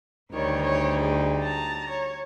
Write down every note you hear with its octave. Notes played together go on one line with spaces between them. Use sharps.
D2 D#3 G3 D#4 C#5
C#5
G#4
A5 A#5
C#5